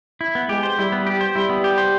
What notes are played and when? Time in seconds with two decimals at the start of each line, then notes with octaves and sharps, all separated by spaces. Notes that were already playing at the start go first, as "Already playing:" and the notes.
0.21 E4
0.35 B3
0.49 G#3 G4
0.63 C5
0.78 G3 E4
0.92 B3
1.07 G4
1.21 C5
1.36 G3 E4
1.50 B3
1.64 G4
1.78 C5